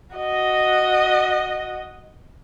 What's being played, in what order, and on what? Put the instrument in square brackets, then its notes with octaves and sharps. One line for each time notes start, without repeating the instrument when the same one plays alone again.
[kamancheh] F#4 D#5